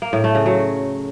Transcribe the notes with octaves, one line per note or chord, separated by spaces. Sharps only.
A#3
A2
A3
C#3
F#3